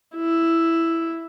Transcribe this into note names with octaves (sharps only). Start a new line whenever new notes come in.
E4